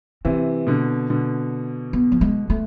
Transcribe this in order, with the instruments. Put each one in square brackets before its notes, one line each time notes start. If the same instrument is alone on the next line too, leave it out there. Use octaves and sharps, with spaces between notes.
[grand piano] C3 E3 [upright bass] C4
[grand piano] B2 D3
B2 D3
[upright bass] B3
F3
G#3
A3